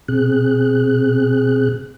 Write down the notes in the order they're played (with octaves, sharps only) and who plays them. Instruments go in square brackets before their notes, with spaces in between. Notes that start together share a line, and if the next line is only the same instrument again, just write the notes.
[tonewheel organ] B2 C4 G#4 F#6